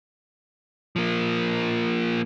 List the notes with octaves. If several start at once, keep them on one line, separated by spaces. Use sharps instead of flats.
F3 A#3